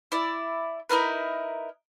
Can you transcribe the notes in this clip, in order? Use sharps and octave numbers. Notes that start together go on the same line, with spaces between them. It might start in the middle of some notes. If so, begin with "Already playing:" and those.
E4 D5
D#4 E4 A#4 B4